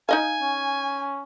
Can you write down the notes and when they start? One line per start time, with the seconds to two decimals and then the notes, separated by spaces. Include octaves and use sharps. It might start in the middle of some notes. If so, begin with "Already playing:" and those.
0.09 D#4 D#5 F5 G#5
0.41 C#4